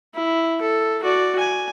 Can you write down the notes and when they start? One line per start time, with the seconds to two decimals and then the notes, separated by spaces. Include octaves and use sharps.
0.15 E4
0.61 A4
1.03 F#4 D5
1.39 G#5